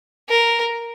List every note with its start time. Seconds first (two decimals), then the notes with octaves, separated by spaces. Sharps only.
0.29 A#4